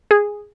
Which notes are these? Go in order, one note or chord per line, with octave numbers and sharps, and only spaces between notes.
G#4